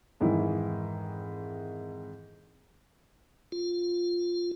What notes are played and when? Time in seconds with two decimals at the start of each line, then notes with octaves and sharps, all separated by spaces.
0.20 F2 G#2 D#3 E3 E4
3.52 F4